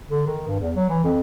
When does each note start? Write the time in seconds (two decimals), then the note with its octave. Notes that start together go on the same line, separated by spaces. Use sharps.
0.11 D3
0.27 D#3
0.47 G2
0.60 E2
0.75 F#3
0.89 E3
1.04 F2